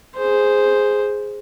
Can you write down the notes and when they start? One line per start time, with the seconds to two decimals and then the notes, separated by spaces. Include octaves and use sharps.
0.16 G#4 C5